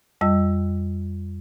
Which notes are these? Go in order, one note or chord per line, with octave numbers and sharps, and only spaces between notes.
F2 G3 D#5 E6